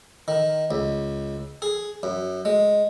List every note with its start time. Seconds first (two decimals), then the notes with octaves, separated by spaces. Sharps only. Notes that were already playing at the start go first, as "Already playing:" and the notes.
0.28 D#3
0.71 C#2
1.62 G#4
2.03 F#2
2.45 G#3